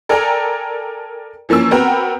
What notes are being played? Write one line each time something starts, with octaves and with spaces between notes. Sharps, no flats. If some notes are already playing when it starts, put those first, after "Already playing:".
A4 A#4 D5 G5 G#5 A#5
E3 F3 A#3 C#4 E6
B3 C4 F#4 A#4 G5 A#5